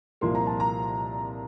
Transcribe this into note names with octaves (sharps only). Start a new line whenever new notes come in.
C2 A#2 F3 A#3 C6
A#5
A5
A#5